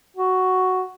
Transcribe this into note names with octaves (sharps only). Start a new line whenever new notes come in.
F#4